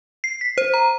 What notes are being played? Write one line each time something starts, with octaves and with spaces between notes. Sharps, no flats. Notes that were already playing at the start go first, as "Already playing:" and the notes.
C7
B6
C5
A#5